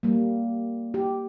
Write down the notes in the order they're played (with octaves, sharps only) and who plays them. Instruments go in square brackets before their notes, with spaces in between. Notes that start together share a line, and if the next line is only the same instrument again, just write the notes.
[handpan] G3 A#3
G4